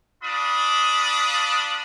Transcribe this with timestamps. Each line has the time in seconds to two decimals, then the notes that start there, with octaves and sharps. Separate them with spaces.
0.22 D4 F4 B5 D#6